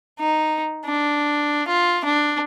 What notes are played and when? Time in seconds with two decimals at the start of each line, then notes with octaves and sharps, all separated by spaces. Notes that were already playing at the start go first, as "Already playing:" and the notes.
0.20 D#4
0.86 D4
1.68 F4
2.05 D4